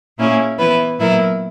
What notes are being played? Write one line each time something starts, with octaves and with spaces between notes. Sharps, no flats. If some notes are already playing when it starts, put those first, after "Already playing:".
A#2 A#3 C#4 E4 G#4
E3 B3 E4 B4
A#2 F#3 B3 E4 A#4